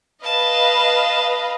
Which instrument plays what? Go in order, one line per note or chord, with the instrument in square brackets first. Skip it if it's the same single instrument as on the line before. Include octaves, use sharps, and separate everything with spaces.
[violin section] B4 D#5 F5 [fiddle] A5